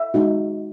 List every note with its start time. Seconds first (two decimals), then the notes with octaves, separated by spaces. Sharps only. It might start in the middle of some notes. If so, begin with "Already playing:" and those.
Already playing: E5
0.14 G#3 D#4 F#4